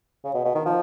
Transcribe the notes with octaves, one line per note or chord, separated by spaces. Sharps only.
C#3
B2
B2
D#3
F3